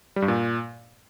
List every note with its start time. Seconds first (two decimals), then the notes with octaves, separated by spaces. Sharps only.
0.16 G3
0.22 G2
0.28 A#2